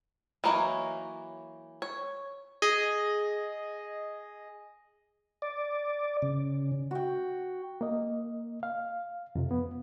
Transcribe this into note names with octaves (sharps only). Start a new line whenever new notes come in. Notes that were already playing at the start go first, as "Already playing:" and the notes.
E3 F#3 A#3 D#4 C#5
C#5
G#4 D#5
D5
C#3
F#4 G5
A#3 D#5
F5
F2 C3
B3